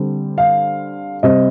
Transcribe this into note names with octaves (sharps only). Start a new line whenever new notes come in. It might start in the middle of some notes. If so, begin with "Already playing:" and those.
Already playing: D3 G3 C4
F5
C3 G3 C4 D#5